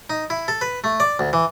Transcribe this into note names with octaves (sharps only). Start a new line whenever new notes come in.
D#4
E4
A4
B4
A3
D5
D2
E3